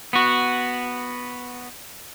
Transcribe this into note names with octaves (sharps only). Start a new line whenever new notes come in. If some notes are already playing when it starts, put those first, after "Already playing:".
B3 F#4